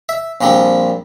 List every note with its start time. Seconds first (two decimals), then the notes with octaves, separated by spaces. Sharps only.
0.09 E5
0.41 A#1 A#2 F3 G3 C4